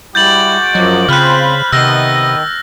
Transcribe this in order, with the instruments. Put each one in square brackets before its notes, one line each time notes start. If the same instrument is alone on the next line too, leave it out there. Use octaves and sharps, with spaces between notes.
[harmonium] G3 E4 [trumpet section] G#3 F#4 D6 [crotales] G6 A6 F#7
[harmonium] F#2 F3 D#5 [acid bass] F#3
[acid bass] C#3 [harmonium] C4 F4 [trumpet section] C5 B5 [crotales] F6 F#6
[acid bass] C3 [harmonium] D#3 [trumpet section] B3 D#5 [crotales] E6 A#6